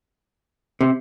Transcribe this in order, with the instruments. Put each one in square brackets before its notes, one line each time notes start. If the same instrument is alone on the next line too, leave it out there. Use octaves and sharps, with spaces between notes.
[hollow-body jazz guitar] C3